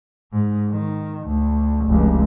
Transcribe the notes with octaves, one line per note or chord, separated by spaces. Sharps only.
G#2
D#3
D2
F1 C#2